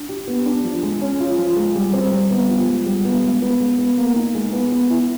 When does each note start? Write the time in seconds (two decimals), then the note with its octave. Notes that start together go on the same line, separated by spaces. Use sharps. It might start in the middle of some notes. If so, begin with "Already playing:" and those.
Already playing: D4
0.09 G4
0.28 B3
0.46 D4
0.64 F3
0.83 G#3
1.02 C#4
1.20 F4
1.38 F3
1.57 G#3
1.75 G3
1.94 C4
2.12 G3
2.31 B3
2.49 F3
2.68 G#3
2.86 G3
3.05 B3
3.24 G#3
3.42 B3
3.60 G#3
3.79 B3
3.98 A#3
4.15 D#4
4.35 G#3
4.53 B3
4.72 B3
4.90 E4